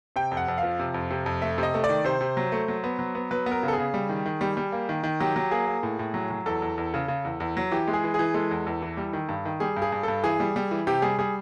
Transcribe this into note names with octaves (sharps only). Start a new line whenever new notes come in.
C3 G5
F2
F#5
F2
F5
F3
C3
F2
C3
F2
A3 E5
C3 D#5
A3
D5
D#3
C3 C5
C3
F#3
A3
F#3
B3
F#3
B3
F#3 B4
B3
A#4
C#3
A4
G#4
C#3
G3
D#3
D#3
G3
G3
A#3
D#3
D#3
F#3 G4
F#3
A#3 G#4
A#3
A2
A2
F#3
F#3
E2 A4
E2
E2
C#3
C#3
E2
E2
F#3
E3 G4
G#3
G#4
E3
E3 G#4
G#3 A4
E2
E2
E3
G3
D#3
G2
D#3
G3 G#4
G2
G#4
G2
G2 A4
E3 G#4
G3
G3
E3
C3 G4
G3 G#4
G3 G#4